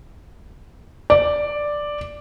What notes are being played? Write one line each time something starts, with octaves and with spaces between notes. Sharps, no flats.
D5